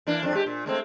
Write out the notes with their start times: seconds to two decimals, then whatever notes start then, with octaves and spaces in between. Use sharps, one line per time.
0.07 E3 A#3 D4
0.23 F2 D4
0.34 G#3 G4
0.46 A#2
0.66 G#3 A3 C4